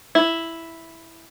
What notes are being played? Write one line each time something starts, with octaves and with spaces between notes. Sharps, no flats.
E4